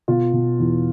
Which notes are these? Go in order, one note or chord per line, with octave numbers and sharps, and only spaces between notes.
B2 F4
B2
E2